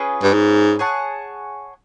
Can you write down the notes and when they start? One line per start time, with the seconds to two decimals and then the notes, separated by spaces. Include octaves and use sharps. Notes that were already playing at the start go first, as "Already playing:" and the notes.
Already playing: C#4 F4 G#4 B4
0.23 G2
0.33 G#2
0.79 G#4 C#5 F#5 A5